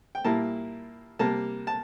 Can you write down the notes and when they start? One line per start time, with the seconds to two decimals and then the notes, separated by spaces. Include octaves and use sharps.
0.15 G5
0.25 A#2 G3 A#3 E4 A5
1.19 C3 G3 A#3 A5
1.67 A5